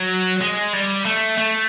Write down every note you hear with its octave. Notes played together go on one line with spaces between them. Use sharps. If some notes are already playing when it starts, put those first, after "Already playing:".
Already playing: F#3
G#3
G3
A3
A3